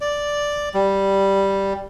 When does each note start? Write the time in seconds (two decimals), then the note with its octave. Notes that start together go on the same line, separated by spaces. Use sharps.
0.01 D5
0.74 G3